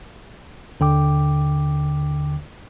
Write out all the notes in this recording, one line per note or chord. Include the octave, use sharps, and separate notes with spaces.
D#2 D3 G5 D6